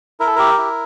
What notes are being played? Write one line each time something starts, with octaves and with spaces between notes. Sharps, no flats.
E4 A#4
A4
G4 A#4
E4